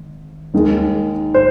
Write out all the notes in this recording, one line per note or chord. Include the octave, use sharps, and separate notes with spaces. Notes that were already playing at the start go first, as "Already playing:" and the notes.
Already playing: G#1
D#2 D#3 G#3
C5